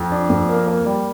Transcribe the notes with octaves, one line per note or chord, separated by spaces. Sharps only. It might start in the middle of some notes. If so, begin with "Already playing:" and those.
Already playing: F2
D4
F2
A#3
A#3
G3